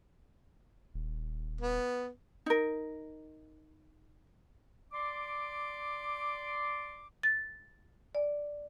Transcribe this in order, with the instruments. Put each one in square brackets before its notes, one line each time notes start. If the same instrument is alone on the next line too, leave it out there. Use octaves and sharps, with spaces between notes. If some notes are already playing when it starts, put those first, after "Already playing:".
[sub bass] D#1
[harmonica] B3
[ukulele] D#4 A#4
[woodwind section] D5 C6 D6
[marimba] A6
D5